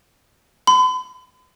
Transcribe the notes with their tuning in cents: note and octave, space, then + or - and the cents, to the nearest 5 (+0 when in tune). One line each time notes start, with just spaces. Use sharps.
B5 +45